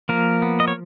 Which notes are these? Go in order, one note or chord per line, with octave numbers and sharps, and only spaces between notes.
F3 A#3 A#4
B3
D#5
C#5